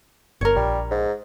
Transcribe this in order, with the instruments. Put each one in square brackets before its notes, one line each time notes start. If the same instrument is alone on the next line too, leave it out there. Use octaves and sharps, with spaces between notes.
[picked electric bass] G1 [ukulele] A#4 C#5
[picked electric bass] A#1 [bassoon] G3
[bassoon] G#2